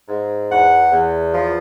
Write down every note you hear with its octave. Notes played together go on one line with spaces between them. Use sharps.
G#2
E2 F#5
E2
F3